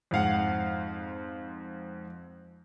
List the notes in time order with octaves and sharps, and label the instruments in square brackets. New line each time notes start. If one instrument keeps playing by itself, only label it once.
[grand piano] F2 G#2 F5 F#5